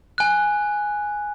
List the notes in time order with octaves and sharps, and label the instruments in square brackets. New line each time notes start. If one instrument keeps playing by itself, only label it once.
[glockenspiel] G#5 F#6